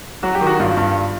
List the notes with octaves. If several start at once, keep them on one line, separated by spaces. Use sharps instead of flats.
F#3 F#4
G4
D#3
F#4
G2 F4
G2